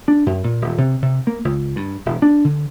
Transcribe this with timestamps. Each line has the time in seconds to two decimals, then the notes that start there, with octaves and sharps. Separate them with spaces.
0.08 D4
0.26 F#2
0.44 A#2
0.61 D#1
0.78 C3
1.02 C3
1.27 A#3
1.45 C#2
1.76 G2
2.06 E1
2.22 D4
2.44 D3